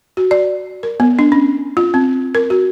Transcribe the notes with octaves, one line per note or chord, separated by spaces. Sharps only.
F#4
D5
A#4
B3
D4
C#4
F4
C4
A#4
F#4